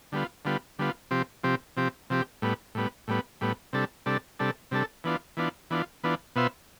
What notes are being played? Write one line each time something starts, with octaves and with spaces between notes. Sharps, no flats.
D3 G3 B3 F4
D3 G3 B3 F4
D3 G3 B3 F4
C3 F3 C4 G4
C3 F3 C4 G4
C3 F3 C4 G4
C3 F3 C4 G4
A2 G3 B3
A2 G3 B3
A2 G3 B3
A2 G3 B3
C3 G3 D4 A4
C3 G3 D4 A4
C3 G3 D4 A4
C3 G3 D4 A4
E3 B3 D4 F4
E3 B3 D4 F4
E3 B3 D4 F4
E3 B3 D4 F4
B2 B3 F4 C5 E5